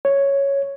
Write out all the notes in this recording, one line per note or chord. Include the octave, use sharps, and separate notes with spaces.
C#5